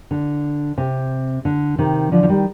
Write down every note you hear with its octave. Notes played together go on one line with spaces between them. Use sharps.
D3
C3
D3
C3 D#3
D3 F3
F3
D#3 G3